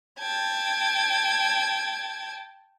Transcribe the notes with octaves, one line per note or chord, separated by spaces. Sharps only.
G5 A5 G#6